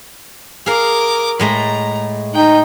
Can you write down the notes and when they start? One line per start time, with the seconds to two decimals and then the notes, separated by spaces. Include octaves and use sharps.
0.66 G#4 A#4 F5 D6
1.40 A2 G#3 A3 A#5
2.34 D#4 G5